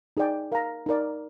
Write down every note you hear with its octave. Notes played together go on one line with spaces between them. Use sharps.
D#4 G#4 D5 G5
A#4 F5 A#5
D#4 A#4 D5